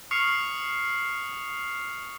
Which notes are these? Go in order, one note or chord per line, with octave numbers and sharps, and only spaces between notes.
C#6 D#6 F6 C7 C#7 F7